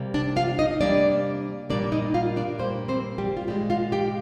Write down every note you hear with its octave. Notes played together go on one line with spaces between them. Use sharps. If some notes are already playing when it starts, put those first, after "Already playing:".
Already playing: C3 G3 A#3
D4 D5
F4 F5
D#4 D#5
C3 G3 A#3 D4 D5
A#2 G3 A#3 D4 D5
D#4 D#5
F4 F5
D4 D5
A#2 G3 A#3 C4 C5
C4 C5
G3 G4
F4
A#2 G3 G#3 G4
F4 F5
G4 G5